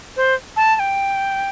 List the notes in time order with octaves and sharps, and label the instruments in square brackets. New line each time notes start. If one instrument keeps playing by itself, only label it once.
[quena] C5
A5
A5
G5